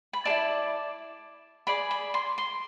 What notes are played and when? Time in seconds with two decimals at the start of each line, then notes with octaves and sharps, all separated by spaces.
0.13 B5
0.25 G#4 D5 A5
0.30 E4
1.67 G#4 D5 B5
1.91 B5
2.14 C6
2.38 C6